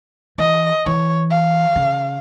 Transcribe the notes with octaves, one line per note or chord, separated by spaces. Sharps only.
E3 D#5
E3 C#5
F5
C#3